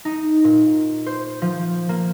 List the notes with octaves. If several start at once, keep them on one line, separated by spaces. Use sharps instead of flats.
D#4
A#2
C5
F3
A#3